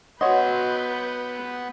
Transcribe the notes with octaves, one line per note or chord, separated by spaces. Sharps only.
B3 F#4 B4 C#5 D#5 F#5 C6 G6